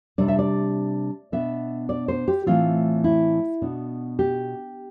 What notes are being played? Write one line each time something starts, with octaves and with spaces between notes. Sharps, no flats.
C3 G3 D4 D5
E5
D5
B2 B3 D4 E5
D5
C5
G4
A2 E3 A3 C4 F4
E4
B2 B3 D4
G4